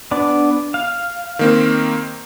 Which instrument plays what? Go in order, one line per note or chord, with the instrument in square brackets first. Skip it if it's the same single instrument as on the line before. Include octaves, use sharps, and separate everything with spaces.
[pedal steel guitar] B3 D4 D5
F5
[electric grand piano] D#3 A#3 C4